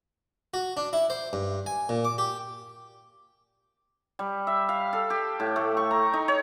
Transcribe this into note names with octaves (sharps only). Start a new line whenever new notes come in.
F#4
D4
E4
C5
G2
G#5
A#2
D6
G4
G3
E5
F5
A4
G4
A2
A3
C#6
A#5
D#4
C#5